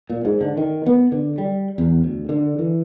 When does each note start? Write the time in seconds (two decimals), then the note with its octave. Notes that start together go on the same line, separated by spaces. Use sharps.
0.10 A#2
0.25 G#2
0.41 D3
0.57 D#3
0.86 B3
1.12 D3
1.38 G3
1.78 E2
2.04 D2
2.29 D3
2.59 E3